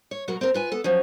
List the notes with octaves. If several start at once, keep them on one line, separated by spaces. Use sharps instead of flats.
C#5
B2 F#3 F#4 A#4
C4 A#4
F4 B4 G#5
B3 A4
F3 F#3 C#4